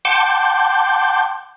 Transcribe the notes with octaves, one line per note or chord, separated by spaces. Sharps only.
F#5 G5 A5 C6 D6 G6